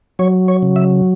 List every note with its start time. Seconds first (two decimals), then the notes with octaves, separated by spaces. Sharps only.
0.19 F#3 C#5
0.48 C#5
0.63 C#3
0.76 E5